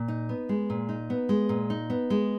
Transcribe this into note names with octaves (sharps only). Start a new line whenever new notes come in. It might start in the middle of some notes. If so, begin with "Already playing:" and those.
Already playing: A#2
D#4
B3
G#3
A#2
D#4
B3
G#3
A#2
D#4
B3
G#3